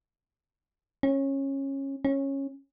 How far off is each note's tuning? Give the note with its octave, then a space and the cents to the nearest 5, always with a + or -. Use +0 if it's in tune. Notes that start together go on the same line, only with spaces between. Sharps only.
C#4 -20
C#4 -15